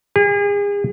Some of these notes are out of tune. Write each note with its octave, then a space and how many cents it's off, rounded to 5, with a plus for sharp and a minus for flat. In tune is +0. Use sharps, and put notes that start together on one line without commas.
G#4 -35